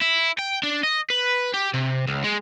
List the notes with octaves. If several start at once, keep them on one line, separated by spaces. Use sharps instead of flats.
E4
G5
D4
D#5
B4
G4
C3
C#2
G#3